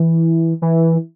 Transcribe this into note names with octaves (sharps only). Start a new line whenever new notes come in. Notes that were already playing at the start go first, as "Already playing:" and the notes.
Already playing: E3
E3